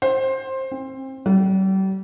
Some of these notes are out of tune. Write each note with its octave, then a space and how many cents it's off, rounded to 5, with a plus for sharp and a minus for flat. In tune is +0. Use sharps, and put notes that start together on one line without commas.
C5 +15
C4 +30
G3 -40